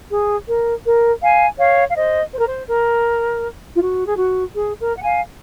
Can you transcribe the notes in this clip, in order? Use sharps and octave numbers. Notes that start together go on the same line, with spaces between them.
G#4
A#4
A#4
F5 G#5
C#5 F5
F5
C5 D#5
C5
A#4
C5
A#4
F4
F#4
G#4
F#4
G#4
A#4
F#5
F5 G#5